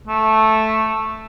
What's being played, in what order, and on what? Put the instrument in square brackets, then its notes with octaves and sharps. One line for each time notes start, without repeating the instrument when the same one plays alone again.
[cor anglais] A3